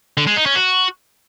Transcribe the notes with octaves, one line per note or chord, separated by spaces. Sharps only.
D3
G#3
D#4
C#4
F#4